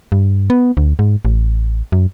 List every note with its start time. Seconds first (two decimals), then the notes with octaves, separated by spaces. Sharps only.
0.12 G2
0.50 B3
0.77 D2
0.99 G#2
1.25 A1
1.92 F#2